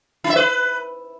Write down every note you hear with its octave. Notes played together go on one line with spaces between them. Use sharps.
E4
E5
B4